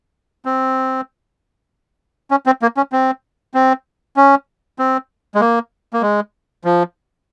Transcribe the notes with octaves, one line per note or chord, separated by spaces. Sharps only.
C4
C#4
C4
A#3
C#4
C4
C4
C#4
C4
G#3
A#3
A#3
G#3
F3